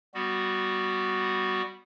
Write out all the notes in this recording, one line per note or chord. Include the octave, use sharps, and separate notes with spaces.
G3 B3 F#4